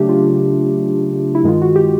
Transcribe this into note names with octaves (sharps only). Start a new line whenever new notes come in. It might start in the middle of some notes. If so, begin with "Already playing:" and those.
Already playing: C#3 F#3 A3 D4 G4
F4
E4
G2 D#3 G#3 F4
F#4
G4